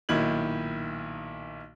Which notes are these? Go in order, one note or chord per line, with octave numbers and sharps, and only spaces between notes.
B1 A#2 D#3 E4 G#6 F#7